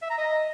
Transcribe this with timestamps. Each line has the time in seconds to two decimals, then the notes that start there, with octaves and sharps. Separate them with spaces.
0.02 E5
0.10 A#5
0.18 D#5